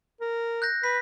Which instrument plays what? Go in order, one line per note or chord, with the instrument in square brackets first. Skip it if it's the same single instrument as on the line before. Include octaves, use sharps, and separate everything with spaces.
[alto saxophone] A#4
[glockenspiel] F#6 G6 A#6
[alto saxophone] B4 [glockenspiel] B6